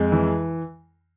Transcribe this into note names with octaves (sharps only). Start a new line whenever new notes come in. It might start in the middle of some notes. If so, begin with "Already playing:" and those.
Already playing: F2 G#3
E3